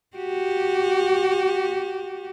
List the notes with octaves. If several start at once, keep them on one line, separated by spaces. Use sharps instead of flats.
F#4 G4